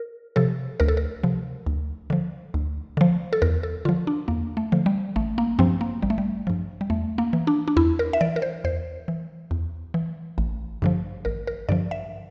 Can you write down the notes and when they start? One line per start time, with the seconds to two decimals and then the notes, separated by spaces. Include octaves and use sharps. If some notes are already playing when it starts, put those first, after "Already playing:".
Already playing: A#4
0.36 C3 F3 A4
0.80 D2 A#4
0.88 A4
0.97 A#4
1.23 C3 F3
1.66 D2
2.10 D3 F3
2.54 D2
2.97 D3 F3
3.33 A4
3.42 E2 A#4
3.63 A4
3.85 D3 F3 F4
4.07 D4
4.28 E2 A#3
4.57 A3
4.72 D3 F3
4.86 G3
5.16 A1 A3
5.38 A#3
5.59 G2 F3 C4
5.81 A#3
6.02 A1 G3
6.10 A3
6.18 G3
6.47 G2 F3
6.81 G3
6.90 E2 A3
7.18 A#3
7.33 E3
7.47 D4
7.68 D4
7.77 E2 E4
7.99 A#4
8.13 E5
8.21 E3 D5
8.36 A#4
8.42 C5
8.64 E2 C5
9.08 E3
9.51 E2
9.94 E3
10.38 A1
10.82 G2 D3 F3
11.25 A1 A#4
11.47 A#4
11.69 G2 D3 F3 D5
11.91 E5